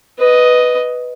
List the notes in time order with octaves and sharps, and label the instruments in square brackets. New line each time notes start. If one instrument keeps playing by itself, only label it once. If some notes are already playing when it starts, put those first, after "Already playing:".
[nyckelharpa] B4 D#5